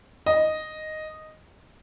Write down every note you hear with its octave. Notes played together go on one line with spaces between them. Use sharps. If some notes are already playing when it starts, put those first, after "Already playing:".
D#5